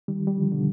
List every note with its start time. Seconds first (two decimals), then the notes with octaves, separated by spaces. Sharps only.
0.08 D#3 G3
0.27 G3
0.37 D3 F3
0.51 B2 D3